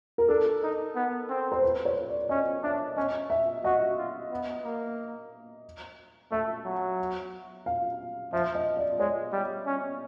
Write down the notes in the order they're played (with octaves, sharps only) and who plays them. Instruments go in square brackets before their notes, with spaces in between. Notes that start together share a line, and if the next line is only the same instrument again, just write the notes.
[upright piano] A#4
[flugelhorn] D4 [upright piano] A4
[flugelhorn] D#4
B3
C4
[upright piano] C5
B4
C#5
D5
[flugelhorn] C#4 [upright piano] D#5
[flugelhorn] D4 [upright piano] E5
[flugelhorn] C#4 [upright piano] D#5
[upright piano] E5
[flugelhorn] F#4 [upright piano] D#5
[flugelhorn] F4
B3
A#3
[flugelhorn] A3 [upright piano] E5
[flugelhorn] F#3
[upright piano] F5
[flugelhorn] F3 [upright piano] E5
[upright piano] D#5
D5
[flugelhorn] G#3 [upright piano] C#5
[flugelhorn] G3
C#4